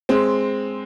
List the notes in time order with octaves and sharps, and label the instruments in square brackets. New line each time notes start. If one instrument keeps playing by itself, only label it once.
[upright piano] G#3 C4